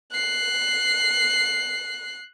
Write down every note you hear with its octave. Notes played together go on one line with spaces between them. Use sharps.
F#6 C7